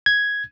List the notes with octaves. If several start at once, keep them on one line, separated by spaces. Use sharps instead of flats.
G#6